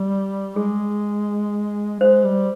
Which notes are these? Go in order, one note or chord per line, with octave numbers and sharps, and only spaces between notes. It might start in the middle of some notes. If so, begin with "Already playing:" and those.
Already playing: G3
G#3 G#4
G#3 C5
G3